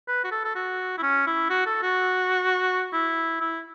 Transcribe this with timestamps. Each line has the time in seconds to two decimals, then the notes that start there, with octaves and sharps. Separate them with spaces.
0.08 B4
0.24 F#4
0.32 A4
0.45 A4
0.55 F#4
0.98 E4
1.03 C#4
1.27 E4
1.50 F#4
1.66 A4
1.82 F#4
2.93 E4
3.41 E4